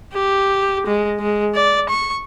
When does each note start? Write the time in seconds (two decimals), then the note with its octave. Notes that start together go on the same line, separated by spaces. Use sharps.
0.14 G4
0.87 G#3
1.20 G#3
1.55 D5
1.89 C#6